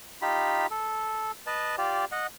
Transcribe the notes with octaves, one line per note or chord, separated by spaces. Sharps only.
D#4 F4 G4 B5
A4
B4 D#5 A5
F4 G4 D5
D#5 F#5